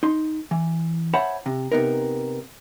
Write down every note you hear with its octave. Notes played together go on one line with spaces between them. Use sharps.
D#4 C6
E3
C5 C#5 E5 F#5 A5 B5
C3
C3 B3 D#4 A#4